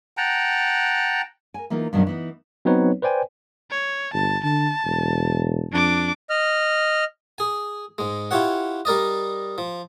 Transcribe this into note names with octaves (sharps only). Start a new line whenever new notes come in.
F#5 G5 A5 A#5
A#4 G#5
E3 A#3 B3 D#4 F4
G2 B2 D#3 F#3 B3 C#4
E3 B3 D#4
F#3 B3 C4 D#4 B4 C#5
B4 C5 D5 G5 G#5
C#5
G1 A5
D3 A5
E1
F2 D4 D6
D#5 F6
G#4 G#5
G#2 G#3
E4 F4 G4 C#5 F#5
G3 A#4 D5 D#5
F3